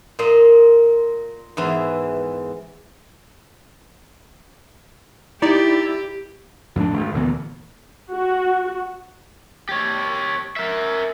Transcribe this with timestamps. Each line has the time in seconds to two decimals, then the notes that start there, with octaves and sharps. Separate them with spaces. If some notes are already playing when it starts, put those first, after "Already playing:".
0.19 A#2 A#3 D#5 C6
1.57 E2 G#2 E3
5.42 D#4 E4 G4 D5
6.76 F2 A2 A#3 D4
6.94 G#1
7.14 D2 A#2 E3 B3
8.12 F#4
9.69 G4 C#5
10.56 A#4 E5